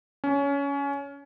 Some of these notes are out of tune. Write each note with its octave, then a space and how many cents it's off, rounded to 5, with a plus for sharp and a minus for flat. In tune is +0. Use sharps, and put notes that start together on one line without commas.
C#4 +20